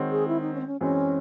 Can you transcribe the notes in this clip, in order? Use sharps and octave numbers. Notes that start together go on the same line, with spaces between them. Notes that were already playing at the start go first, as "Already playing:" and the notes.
Already playing: D#3 G#3 C4 F#4 C#5
G#4
E4
D#4
C#4
C4
C#4
F#2 E3 G#3 C4 C#4